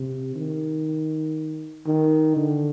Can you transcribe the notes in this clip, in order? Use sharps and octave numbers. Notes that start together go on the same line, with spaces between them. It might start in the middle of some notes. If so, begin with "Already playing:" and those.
Already playing: C3
D#3
D#3
D3